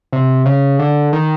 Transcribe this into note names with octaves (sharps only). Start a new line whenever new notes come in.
C3
C#3
D3
D#3